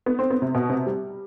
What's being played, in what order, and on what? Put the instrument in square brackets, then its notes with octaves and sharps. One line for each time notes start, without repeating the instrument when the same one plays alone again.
[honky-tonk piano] B3
C4
B3
C3
B2
C3
G3